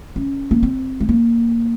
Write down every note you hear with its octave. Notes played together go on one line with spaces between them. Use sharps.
C#4
A#3
C4
G#3
A#3